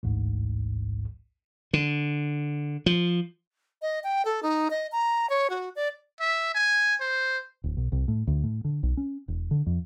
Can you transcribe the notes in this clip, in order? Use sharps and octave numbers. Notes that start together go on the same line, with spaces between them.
A1 D2 G#2
D3
F3
D#5
G5
A4
D#4
D#5
A#5
C#5
F#4
D5
E5
G#5
C5
D1
B1
C2
A2
D2
A2
D3
B1
C#4
E1
D3
F2